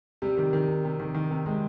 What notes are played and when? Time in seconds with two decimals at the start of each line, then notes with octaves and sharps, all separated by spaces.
0.22 C3 G3
0.37 D#3
0.53 D#3
0.68 C3
0.85 C3
1.00 D#3
1.15 D#3
1.31 C3
1.46 C3 G#3